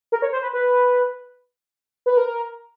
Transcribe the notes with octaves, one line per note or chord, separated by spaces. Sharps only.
A#4
C#5
C5
B4
B4
B4
A#4